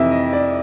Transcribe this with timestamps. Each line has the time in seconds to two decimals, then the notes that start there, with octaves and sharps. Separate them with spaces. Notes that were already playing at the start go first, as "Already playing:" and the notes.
Already playing: F2 C3 E3 D#5 E5
0.12 D#5
0.33 D5